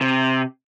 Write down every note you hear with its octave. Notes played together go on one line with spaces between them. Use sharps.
C3